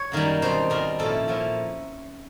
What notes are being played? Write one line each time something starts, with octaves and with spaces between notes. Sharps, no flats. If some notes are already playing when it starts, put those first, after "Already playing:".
Already playing: C#5
F#2 D#3 G3 A#3 D#4
B2 G3 C4 D#4 C5
B2 G3 C4 D#4 A#4
A#2 F3 A#3 C#4 E4 A4
A#2 F3 A#3 C#4 E4